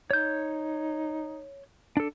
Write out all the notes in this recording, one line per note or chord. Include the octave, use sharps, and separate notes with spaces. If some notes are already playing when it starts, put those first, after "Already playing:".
D#4 C#5 G6
D4 A4